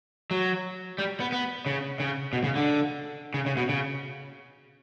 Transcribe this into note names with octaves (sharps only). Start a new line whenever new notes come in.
F#3
G3
B3
B3
C#3
C#3
B2
C#3
D3
C#3
C#3
B2
C#3